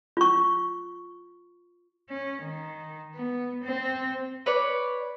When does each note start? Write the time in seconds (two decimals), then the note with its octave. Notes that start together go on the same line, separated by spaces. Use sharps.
0.17 F4 C#6
2.10 C#4
2.42 D#3
3.15 B3
3.63 C4
4.46 B4 C#5 D5